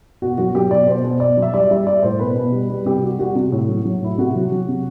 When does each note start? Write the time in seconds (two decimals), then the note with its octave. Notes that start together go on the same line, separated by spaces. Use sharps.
0.22 B2 F#4
0.38 F#3 F#4
0.55 F#3 G4
0.71 B2 D5
0.88 B2 C5
1.04 B2
1.20 B2 D5
1.37 F#3
1.42 E5
1.54 G3 D5
1.70 G3 E5
1.87 G3 D5
2.03 A2 C5
2.20 B2 B4
2.36 B2
2.52 G3
2.70 G3
2.86 C3 G4
3.02 G3 F#4
3.19 G3 F#4
3.35 C3
3.52 A2
3.69 F#3
3.85 F#3
4.01 A2 E4
4.18 C3 F#4
4.35 F#3
4.52 F#3
4.68 C3